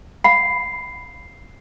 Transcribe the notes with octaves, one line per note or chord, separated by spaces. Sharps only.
F5 B5 C7